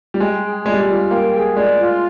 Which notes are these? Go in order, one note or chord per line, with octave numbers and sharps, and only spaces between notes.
G3
G#3 G5
G#4
G#3 D5
G3
G#3
F4
A#3 G5
G#4
G#3 D5
F4